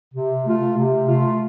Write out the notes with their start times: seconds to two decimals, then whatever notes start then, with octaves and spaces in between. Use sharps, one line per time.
0.14 C3
0.46 A3 F4
0.77 C3
1.08 A3 F4